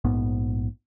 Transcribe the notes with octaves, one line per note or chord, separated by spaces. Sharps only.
A#1 G#2 B3